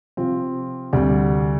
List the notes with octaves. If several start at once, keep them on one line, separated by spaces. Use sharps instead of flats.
C3 F3 C4 F4
D2 C3 G3